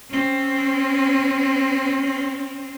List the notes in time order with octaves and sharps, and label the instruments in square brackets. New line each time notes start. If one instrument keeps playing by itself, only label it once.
[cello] C4 C#4